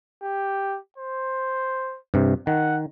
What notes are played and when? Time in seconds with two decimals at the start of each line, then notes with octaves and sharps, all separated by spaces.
0.23 G4
0.98 C5
2.14 G2 C3
2.47 D#3 F#5